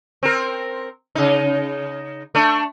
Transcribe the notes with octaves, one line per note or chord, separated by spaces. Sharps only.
C4 A#4
C#3 D#4
A3 D4